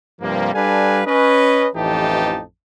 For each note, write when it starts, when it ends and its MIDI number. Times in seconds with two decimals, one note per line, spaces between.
0.21 0.52 43
0.21 0.52 48
0.21 0.52 53
0.21 0.52 55
0.21 0.52 58
0.54 1.02 55
0.54 1.02 62
0.54 1.02 69
0.54 1.02 71
0.54 1.02 77
0.54 1.02 80
1.06 1.67 61
1.06 1.67 71
1.06 1.67 75
1.75 2.42 33
1.75 2.42 41
1.75 2.42 52
1.75 2.42 63
1.75 2.42 67
1.75 2.42 81